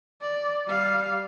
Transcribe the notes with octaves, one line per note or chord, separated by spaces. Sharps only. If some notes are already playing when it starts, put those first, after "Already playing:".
D5
G3 F5